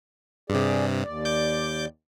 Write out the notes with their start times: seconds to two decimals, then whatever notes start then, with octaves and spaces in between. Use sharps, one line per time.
0.50 G2 C3 G#4 D5
1.03 D#2 D5
1.25 D6 G6